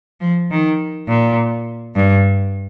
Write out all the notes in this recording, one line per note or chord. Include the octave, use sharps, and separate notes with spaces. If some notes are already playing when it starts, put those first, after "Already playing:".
F3
D#3
A#2
G2